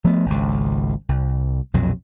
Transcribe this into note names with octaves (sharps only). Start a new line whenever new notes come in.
F3 A3 B3
G#1 C#2
C2
B1 F2 A#2 F#3